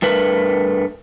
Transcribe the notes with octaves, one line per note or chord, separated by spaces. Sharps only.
G2 A3 A#4 B4